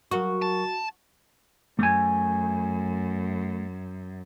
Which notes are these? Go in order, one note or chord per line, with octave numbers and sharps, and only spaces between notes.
F#3 F#4 A#4 C#6
A5
F#2 A3 G#5